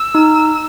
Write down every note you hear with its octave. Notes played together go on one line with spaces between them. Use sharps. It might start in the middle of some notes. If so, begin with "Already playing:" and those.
Already playing: E6
D#4